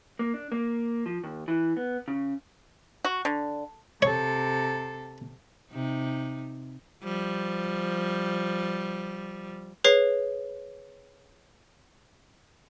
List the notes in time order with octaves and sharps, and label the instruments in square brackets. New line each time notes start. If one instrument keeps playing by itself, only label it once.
[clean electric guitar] A#3
D4
A#3
F3
D#2
E3
B3
C#3
[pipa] F#4
D3
[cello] C3 A4 [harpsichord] C#5
[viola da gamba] C3 D#4
F3 G3
[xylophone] G#4 B4 C#5 C7